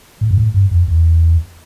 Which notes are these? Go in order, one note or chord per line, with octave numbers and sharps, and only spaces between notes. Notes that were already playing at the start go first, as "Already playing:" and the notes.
A2
G2
A2
G2
F2
E2